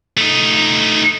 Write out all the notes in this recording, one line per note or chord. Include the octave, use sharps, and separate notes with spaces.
A3 D#4